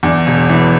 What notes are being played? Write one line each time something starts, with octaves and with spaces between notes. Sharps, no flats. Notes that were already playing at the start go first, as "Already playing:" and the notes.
E2 D4
E1
E3